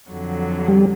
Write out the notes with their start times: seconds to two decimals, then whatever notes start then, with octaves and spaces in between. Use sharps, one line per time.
0.11 F2 D3 F#3
0.68 G3